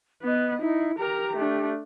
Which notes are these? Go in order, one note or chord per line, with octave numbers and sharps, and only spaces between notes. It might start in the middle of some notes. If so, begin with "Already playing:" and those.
B3 B4 D#5
D#4 E4
G4 A#4 A#5
A3 D4